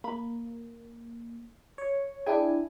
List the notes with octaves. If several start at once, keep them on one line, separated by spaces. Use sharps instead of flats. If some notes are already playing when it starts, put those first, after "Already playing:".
A#3 B5
C#5
D4 E4 G#4 E5 G5 G#5